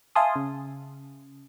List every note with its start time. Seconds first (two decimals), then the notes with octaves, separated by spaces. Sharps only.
0.16 E5 F5 G#5 A5 C6 D#6
0.36 C#3